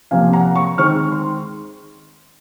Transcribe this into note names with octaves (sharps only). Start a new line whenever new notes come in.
C3 F3 A#3 F5 G#5
F#5 A#5
A#5 C#6
D#3 G#3 C4 D#4 C#6 F6
C6